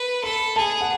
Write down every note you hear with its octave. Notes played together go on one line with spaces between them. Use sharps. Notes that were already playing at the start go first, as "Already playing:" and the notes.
Already playing: B4
A4 B5
G#4 A5
F#5